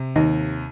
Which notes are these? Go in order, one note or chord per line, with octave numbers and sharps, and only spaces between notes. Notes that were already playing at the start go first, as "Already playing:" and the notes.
Already playing: C3
D#2 D#3 D#4